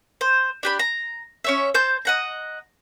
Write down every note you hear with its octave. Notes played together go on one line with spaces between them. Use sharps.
C5
D4 G4 B5
A#5
C#4 C#5 E5
C5 A5 G6
D#5 F#5 A#5